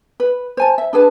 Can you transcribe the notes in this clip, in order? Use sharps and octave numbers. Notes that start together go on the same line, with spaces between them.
B4
C5 G#5 A5
E5
D4 G#4 B4 A5